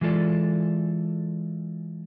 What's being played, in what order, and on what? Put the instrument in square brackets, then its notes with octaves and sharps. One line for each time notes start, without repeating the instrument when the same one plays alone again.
[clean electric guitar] E3 G#3 F4 A4 D5